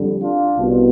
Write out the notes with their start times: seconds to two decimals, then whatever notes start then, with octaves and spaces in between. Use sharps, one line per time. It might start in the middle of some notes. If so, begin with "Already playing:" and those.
Already playing: F2 D3 G3
0.22 D4 F4
0.57 C2 B2 B3